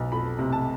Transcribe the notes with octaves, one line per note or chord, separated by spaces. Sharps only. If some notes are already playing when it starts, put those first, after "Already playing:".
Already playing: B1
F2 B5
C3
A5